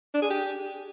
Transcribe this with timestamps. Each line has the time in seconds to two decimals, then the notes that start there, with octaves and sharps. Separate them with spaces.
0.14 D4
0.22 G#4
0.30 G4